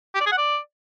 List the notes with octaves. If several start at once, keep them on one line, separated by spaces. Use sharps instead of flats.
G4
D5
G#4
F#5
D5